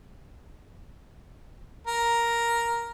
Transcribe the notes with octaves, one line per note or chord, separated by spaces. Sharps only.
A#4